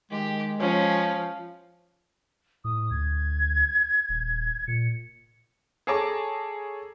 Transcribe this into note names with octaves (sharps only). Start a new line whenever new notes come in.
D#3 G#3 G4
F3 C#4 C#5
A2 D#6
D2 G#6
D#1
A#2 C#7
G#4 A4 C#5 A5 A#5 D6